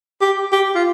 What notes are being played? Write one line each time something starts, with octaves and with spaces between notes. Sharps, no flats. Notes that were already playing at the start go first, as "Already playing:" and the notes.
G4
G4
F4